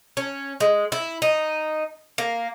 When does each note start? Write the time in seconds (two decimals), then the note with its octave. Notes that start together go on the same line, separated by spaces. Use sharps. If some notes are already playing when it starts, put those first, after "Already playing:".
0.17 C#4
0.60 G#3
0.92 E4
1.22 D#4
2.18 A#3